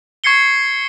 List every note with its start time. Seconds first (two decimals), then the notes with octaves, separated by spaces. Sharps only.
0.24 C#6 G#6 C7 C#7 G7